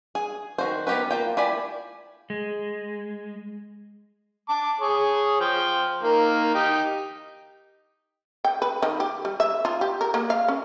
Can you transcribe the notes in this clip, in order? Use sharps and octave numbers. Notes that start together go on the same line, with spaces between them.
G#4
D#3 F#4 C5
B3 D#4 G4 A#4 B4
A#3 F4 G5
E4 F4 G4 D5 G#5
G#3
A5 D6
G#4 C#5
F3 G5
D#3 A#3
D#4 G4
G5
B4
D#3
G4
G3
E5
F4
G4
A#4
A#3
F5
C#4